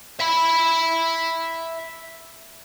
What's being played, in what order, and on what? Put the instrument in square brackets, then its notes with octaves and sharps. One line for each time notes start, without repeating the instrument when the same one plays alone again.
[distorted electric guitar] E5 B5